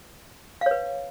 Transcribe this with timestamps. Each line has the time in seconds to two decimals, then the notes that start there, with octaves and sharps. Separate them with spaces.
0.61 F5
0.66 C#5
0.71 B4